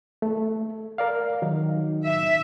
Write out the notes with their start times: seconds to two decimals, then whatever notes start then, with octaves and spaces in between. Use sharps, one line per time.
0.22 A3
0.98 A#4 D5 F5
1.42 D#3 F#3 D#4
2.05 E5